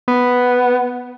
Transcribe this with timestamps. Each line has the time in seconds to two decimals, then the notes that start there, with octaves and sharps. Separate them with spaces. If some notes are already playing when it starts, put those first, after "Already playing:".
0.08 B3